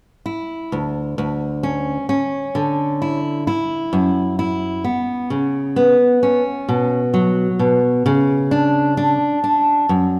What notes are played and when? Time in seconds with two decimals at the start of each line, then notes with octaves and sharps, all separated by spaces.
0.26 E4
0.72 D2
1.18 D2
1.63 C#4
2.09 C#4
2.55 D3
3.02 E4
3.47 E4
3.93 F#2
4.39 E4
4.84 B3
5.30 C#3
5.76 B3
6.23 C#4
6.69 B2
7.14 F#3
7.59 B2
8.06 C#3
8.51 D4
8.97 D4
9.44 D4
9.89 F#2